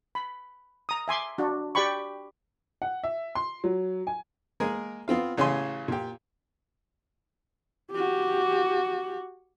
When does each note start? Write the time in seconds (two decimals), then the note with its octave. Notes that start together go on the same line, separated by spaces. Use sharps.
0.15 B5
0.89 A#5 D#6
1.08 E5 G#5 C6 D6
1.38 D4 F#4
1.75 G4 D5 G5 B5 C#6
2.82 F#5
3.03 E5
3.35 C6
3.64 F#3
4.07 G#5
4.60 G#3 A#3 G#4 A#4
5.08 B3 C4 F4 F5
5.37 A1 C#3 C#4 G#5 C6
5.88 A#2 G4
7.92 F#4 G4